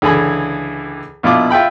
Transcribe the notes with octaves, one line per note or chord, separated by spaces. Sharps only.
C#2 D3 E3 G#4 G#5 B5
A#1 B2 E4 F4 D6
F4 E5 G5 B5